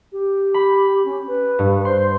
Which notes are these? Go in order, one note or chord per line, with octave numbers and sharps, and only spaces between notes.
G4
B5
C#4
B4
G2
C5 C6